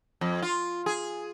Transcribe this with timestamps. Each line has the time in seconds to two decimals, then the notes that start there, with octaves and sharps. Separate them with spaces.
0.21 F2
0.42 F4
0.86 G#4